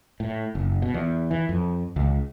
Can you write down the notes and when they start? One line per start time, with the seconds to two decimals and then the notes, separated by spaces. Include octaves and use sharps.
0.20 A2
0.55 F#1
0.82 B2
0.94 E2
1.31 E3
1.49 F2
1.96 C#2